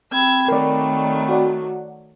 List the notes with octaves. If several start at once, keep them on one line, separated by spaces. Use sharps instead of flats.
C4 G5 B5 E6 G#6
D#3 F#3 A3 A#4 D5
F#4 D5 F#5